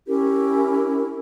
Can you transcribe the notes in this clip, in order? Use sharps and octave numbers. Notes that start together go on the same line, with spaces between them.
C#4 E4 G4 A#4